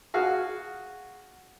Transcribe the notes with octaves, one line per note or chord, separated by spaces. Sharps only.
F#4 G#4 F5